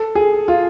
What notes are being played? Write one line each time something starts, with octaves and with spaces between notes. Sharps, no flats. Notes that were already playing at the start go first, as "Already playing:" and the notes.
Already playing: A4
G#4
F4